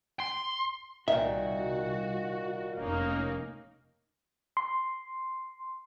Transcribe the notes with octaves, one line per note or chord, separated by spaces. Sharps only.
C6
C2 A#2 D#3 F#4 E5
F1 A#3 C#4 D#4
C6